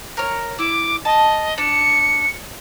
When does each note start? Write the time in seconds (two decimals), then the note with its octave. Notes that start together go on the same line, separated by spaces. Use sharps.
0.17 A#4 C#5
0.59 E4 D6
1.05 D#5 A5
1.58 D4 C#7